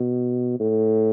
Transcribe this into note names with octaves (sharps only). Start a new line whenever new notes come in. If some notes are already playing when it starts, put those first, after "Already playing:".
Already playing: B2
A2